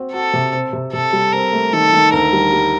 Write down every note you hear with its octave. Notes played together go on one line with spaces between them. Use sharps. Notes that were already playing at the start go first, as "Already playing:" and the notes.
Already playing: C4 F#4
F#4 A4
C3
C4
C3
C3 A4
G3
C4 A#4
A3
D#3 A4
D#3
D2 A#4
G3
G3